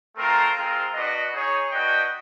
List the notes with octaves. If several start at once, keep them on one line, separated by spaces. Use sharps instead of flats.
A3 C4 F4 A#4
G#3 C4 F4 A#4
D4 F#4 B4 D#5
D#4 G#4 C#5
D4 F#4 B4 D#5 G5